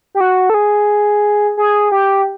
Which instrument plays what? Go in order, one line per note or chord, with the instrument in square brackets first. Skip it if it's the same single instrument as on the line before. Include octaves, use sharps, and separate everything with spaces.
[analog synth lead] G4
F#4
A4
G#4
G#4
G4